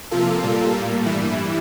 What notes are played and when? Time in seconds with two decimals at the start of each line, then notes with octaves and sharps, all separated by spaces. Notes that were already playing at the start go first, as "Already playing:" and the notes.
0.11 C3 F3 A#3 F4 A4
0.42 A#2 G3 A#3
0.74 A2 G3 A#3
1.05 G2 E3 G3 E4